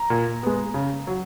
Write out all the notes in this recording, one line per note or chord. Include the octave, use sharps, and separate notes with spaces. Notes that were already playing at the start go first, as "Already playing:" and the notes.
Already playing: A#5
A#2
G#3 B3
C#3
F#3